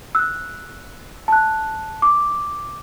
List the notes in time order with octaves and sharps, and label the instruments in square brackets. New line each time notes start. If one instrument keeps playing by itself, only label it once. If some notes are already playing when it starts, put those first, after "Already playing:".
[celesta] E6 F#6
A5 F#6
D6